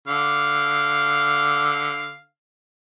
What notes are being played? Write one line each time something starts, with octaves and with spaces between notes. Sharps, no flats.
D3 F5